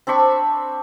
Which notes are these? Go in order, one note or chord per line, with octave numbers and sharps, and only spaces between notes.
C4 D4 B5 C#6